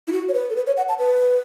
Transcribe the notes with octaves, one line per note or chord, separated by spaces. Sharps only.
E4
F#4
C#5
B4
A4
B4
C#5
F#5
A5
B4